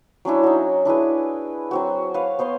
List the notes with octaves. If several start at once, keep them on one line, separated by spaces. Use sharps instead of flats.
F#3 C#4 D4 E4
D#4 F#4
D4 E4 G#4 B4
F#3 C4 F#4
B4 C#5 F5
B3 C5 C#5 C6